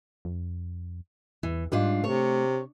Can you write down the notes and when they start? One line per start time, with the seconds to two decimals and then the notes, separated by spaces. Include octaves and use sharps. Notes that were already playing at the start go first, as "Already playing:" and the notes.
0.25 F2
1.43 E2 E3
1.72 G#2 G3 D4 F4
2.04 C3 A3 C#5